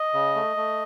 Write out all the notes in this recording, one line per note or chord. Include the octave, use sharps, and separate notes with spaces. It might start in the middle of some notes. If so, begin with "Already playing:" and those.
Already playing: D#5
C#3
A3
A3